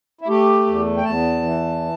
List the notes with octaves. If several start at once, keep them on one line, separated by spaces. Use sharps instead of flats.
E4
A3 G4
E2
G5
E2 A5
E3